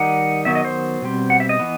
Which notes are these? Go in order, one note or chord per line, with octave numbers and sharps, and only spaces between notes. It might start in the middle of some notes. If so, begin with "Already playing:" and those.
Already playing: D#3 G3 D#4 F#5
D#3 F#3 B3 E5
D#5
C5
B2 G3 C4
F#5
E5
D#5
E3 B3